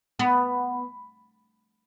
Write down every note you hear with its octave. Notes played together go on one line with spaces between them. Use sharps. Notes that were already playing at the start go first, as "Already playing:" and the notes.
B3